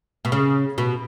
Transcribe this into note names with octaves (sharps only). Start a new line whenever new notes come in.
B2
C#3
B2